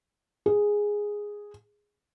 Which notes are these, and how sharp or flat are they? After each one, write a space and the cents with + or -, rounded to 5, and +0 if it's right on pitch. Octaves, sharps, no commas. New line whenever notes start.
G#4 -5